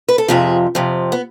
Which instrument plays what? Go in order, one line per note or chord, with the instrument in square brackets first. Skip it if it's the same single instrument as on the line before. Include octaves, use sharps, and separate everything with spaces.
[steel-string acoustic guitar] B4
A4
F2 C3 F3 G#4
F2 C3 F3
B3